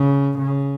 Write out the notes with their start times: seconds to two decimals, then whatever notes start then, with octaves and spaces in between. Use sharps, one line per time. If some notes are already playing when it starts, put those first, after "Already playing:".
Already playing: C#3
0.39 C#3